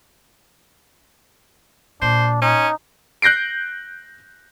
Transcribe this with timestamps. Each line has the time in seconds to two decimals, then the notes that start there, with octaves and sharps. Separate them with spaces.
2.02 A#2 D4 C5
2.42 C#4 D#4
3.22 F#6 G6 A#6 C7 D7